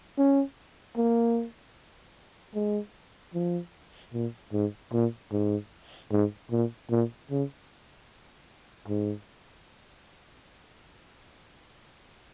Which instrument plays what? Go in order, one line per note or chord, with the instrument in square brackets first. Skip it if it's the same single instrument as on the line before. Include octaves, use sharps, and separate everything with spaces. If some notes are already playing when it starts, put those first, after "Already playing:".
[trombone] C#4
A#3
G#3
F3
A#2
G#2
A#2
G#2
G#2
A#2
A#2
C#3
G#2